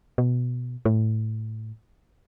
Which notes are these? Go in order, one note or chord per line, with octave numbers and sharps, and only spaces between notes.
B2
A2